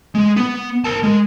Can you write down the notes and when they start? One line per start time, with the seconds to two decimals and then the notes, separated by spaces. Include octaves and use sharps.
0.15 G#3
0.36 B3
0.84 A#4 A5
1.03 G#3